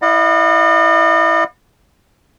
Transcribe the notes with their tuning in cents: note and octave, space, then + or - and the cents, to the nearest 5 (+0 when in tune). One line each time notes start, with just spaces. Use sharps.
E4 +0 D#5 -45 F#5 -45